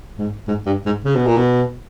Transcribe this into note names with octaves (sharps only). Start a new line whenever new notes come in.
G#2
G#2
G2
G#2
C#3
B2
A#2
B2